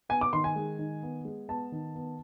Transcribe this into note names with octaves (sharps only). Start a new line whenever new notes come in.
B3 G#5
D6
D#3 C6
G#5
G#3
D#3
B3
G#3
B3 A5
D#3
B3